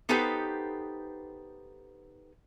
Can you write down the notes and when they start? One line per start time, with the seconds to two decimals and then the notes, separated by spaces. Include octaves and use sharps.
0.09 B3 D#4 G4 A4 B4 C5